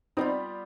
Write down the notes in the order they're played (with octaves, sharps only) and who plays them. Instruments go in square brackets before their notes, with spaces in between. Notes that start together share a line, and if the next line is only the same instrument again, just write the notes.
[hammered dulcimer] G3 B3 F4 [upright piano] C4 D#4